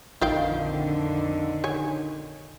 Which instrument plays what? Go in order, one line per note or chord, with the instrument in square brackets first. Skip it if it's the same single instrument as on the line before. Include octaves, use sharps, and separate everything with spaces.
[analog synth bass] A#1 [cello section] F2 D3 [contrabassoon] D#3 [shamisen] F4 F5 G5
[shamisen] C#5 G#5